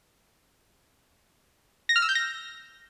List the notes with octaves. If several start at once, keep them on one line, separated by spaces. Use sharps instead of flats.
A#6
F6
E6
G6
A#6